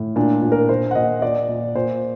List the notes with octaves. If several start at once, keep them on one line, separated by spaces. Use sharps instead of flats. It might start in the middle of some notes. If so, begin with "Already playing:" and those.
Already playing: A2
A#2 D4
A#2
A#4
A#2 C5
F#5
A#2 D#5
A#2 D5
A#2
A#2 C5